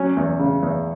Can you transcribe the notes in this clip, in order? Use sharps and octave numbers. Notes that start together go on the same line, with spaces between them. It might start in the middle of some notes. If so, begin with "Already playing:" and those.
Already playing: F#3 C#4
E2
C#3
E2